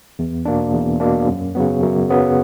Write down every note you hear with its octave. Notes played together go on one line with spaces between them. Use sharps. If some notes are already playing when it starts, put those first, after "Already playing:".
E2
B2 A#3 D4
E2
B2 A#3 D4
F#2
C#3 F#3 B3
F#2
C#3 F#3 B3